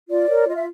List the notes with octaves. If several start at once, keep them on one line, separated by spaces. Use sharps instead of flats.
F4 D5
A#4 C#5
F4 D#5
E5